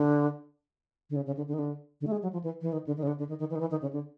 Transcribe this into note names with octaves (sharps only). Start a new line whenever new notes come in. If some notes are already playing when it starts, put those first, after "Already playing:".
Already playing: D3
D3
C#3
C#3
D3
D3
D#3
D3
D3
A3
G#3
F#3
F3
E3
E3
D#3
D3
D#3
C#3
D3
D3
D#3
D#3
E3
D#3
E3
D#3
C#3
D3